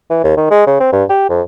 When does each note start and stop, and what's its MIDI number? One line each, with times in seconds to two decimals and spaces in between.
0.10 0.20 52
0.24 0.32 39
0.37 0.48 51
0.51 0.64 56
0.67 0.80 49
0.80 0.89 60
0.93 1.04 43
1.10 1.28 67
1.30 1.42 41